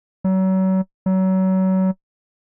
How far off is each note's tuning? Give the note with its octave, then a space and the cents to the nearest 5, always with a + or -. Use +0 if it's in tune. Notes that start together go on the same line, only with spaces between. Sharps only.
F#3 +35
F#3 +30